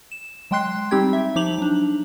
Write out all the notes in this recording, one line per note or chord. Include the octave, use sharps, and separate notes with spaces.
E7
F#3 G#3 G5 C6 F#6 C7
G3 C4 D#4 G4 G5 G#6
E5
F3 D#4 D6 F7 F#7
F#3 D4